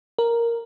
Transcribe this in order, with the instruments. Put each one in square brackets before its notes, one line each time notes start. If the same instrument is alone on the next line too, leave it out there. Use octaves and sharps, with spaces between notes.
[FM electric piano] A#4